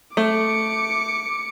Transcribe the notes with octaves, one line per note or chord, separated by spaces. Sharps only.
A3 D6 C#7